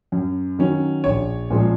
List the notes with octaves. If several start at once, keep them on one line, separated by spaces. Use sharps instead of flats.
F#2
D#3 F#3 C#4
A#1 C#5
A#2 F3 G#3 C#4